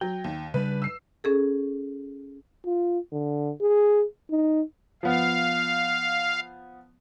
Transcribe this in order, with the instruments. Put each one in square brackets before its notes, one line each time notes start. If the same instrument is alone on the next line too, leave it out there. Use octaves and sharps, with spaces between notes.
[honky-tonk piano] F#3 [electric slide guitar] G5
[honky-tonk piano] D#2
[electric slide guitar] C#3 G3 D4 [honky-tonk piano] B4
[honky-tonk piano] E6 C7
[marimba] C#4 G#4 A4
[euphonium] F4
D3
G#4
D#4
[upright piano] F3 B3 [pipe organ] F5